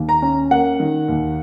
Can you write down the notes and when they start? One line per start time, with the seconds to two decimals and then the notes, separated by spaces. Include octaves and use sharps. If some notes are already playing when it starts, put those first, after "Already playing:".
Already playing: D#2 D#3
0.09 A#5
0.22 C#4
0.51 A#3 F#5
0.80 D#3
1.08 D#2